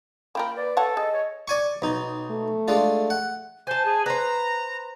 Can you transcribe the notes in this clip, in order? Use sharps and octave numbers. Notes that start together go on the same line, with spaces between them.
A#3 F4 A#4 G5 B5
B4 D5
A4 C#5 F#5 A5
G#4 D#5
C#5
D5 G#5 C#6
B1 D#4
A3
G#3 D4 F4
F#5
C5 G#5 A5
G#4
B4 C5 A#5